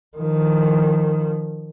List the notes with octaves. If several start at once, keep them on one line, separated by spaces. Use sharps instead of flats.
D#3 F3